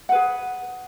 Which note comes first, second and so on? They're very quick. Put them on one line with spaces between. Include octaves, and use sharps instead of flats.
F#5 B4 G#4